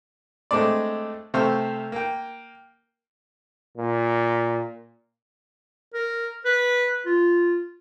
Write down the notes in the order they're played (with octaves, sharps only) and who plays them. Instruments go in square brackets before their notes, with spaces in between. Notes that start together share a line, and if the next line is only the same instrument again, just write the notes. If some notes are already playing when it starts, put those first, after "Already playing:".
[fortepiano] G#3 A3 C4 D4 D5
C3 A3 C5 F5 C#6 E6
A#3 G5
[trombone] A#2
[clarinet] A#4
B4
F4